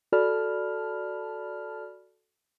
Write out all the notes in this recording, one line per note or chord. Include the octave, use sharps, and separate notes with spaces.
F#4 A4 D5 A5 B5 F6